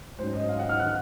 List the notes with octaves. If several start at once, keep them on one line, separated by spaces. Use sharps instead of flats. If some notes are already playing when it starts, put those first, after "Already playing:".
G#2 F#3 C#4 C5
D#5
F5
F#5
F6
D#3 F#6